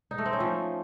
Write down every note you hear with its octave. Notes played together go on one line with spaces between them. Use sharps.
D#4
A3
C4
C#4
F3